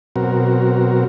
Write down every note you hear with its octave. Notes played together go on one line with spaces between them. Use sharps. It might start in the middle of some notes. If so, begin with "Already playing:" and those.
B2 F#3 C4 F#4 A#4